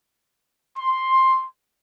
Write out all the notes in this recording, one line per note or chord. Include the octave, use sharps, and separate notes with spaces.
C6